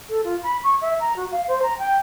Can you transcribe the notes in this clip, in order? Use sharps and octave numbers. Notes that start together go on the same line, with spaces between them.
A4
F4
B5
C#6
E5
A#5
F#4
F5
C5
A#5
G5